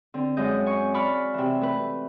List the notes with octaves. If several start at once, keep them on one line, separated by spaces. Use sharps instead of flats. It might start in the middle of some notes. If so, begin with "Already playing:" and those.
D3 C4
F#2 G#3 D#5 G6
G#5 C#6
F#4 D5 B5 C#6 F6
C3 E3
A3 B4